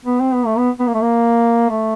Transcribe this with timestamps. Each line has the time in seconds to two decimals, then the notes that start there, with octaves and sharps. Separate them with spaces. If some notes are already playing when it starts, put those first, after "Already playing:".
0.05 B3
0.20 C4
0.34 B3
0.46 A3
0.58 B3
0.80 B3
0.87 A#3
0.94 A3
1.01 A#3
1.70 A3